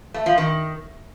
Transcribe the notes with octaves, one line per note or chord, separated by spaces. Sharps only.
A3
F3
D#3